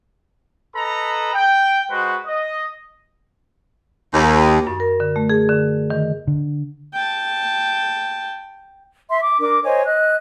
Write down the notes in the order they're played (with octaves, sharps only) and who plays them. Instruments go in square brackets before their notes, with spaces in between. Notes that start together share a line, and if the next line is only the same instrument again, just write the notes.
[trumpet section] A4 B4 D#5 A#5 B5
G5
G#3 F#4 B4 C5 F#5
D#5
[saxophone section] D#2
[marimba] F#2
A#4
D3
A3
G#4
D3
D#3
[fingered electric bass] D3
[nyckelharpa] G5 A5
[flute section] E5 C6
D6
D4 A#4 D6
C5 C#5 D#5 G#5
D#5 F#6